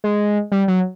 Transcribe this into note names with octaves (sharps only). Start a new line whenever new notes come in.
G#3
G3
F#3